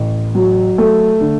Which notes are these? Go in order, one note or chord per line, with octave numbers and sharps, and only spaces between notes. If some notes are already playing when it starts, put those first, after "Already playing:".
Already playing: A1
F#3
A3
D3